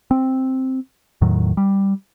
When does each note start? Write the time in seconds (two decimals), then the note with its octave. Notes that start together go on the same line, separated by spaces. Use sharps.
0.11 C4
1.21 E2 A2 D#3 F#3
1.57 G3